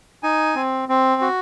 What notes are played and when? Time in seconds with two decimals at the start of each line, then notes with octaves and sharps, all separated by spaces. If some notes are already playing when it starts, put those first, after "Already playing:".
0.23 D#4 G#5
0.55 C4
0.89 C4
1.21 F#4